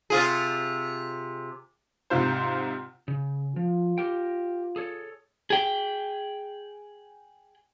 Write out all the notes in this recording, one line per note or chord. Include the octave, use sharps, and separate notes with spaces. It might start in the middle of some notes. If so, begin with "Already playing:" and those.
C3 F4 G#4
G#2 C3 F4 C5
C#3
F3 F4
G4 A#4 G5
G#4 A4 C#5
G#4 G5